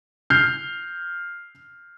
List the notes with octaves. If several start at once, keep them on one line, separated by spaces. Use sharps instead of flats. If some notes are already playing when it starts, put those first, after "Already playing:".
F6 G6 C7